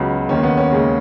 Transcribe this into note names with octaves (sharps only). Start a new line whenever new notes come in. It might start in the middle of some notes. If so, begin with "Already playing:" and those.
Already playing: C#2 C#3 F#3 B3
D#2 D#3 A#3 C#4
B3
C#4
D#2 C#3 G#3